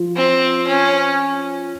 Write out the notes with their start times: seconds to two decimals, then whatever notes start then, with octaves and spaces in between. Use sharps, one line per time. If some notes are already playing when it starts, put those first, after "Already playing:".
Already playing: F3
0.16 C4
0.67 C#4